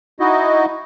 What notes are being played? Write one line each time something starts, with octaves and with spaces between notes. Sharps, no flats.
D#4 E4 F#4 D#5